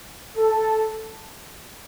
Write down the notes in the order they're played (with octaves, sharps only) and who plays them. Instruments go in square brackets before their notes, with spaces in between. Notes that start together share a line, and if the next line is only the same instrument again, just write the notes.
[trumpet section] A4